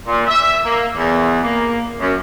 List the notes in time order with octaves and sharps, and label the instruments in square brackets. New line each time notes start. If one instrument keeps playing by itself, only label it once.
[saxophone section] A#2
E5
A#3
E2
A#3
F#2